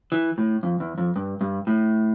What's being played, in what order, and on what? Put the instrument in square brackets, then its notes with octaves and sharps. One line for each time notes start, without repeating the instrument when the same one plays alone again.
[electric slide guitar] E3
A2
F2
E2
F2
G2
G2
A2